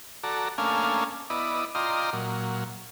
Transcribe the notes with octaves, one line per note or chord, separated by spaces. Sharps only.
F#4 A4 D5 A#5
A3 A#3 C#4 D4 F5 G#5
B3 E4 D5 D#5
F4 D5 D#5 G5 A#5 C6
A#2 F#3